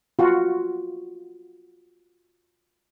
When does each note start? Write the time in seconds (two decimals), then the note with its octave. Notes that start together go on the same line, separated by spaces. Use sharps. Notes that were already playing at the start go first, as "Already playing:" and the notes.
0.19 F4 F#4